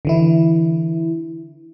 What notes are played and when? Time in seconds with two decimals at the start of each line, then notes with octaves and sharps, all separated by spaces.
0.05 D3 E3 E4